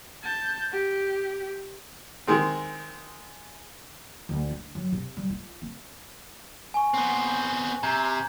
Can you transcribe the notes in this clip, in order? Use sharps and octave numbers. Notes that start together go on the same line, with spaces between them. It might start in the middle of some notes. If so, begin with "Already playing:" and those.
A5 G6
G4
D#3 G#3 C4
D2
D4
F#3
C3
G3
F4
C4
G#5 C#6
B3 C4
C3 A#5 G6 G#6